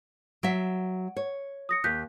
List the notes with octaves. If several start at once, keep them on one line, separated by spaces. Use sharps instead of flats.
F#3 E5 F#5 D7
C#5
D#6 A#6 C#7
D#2 F#6 G6 B6